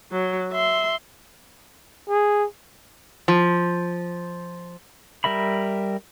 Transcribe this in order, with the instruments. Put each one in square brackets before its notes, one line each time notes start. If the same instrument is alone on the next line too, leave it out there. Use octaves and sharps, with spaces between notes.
[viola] F#3
E5 C6
[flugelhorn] G#4
[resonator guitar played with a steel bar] F3
[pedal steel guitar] G3 A#4 E5 B5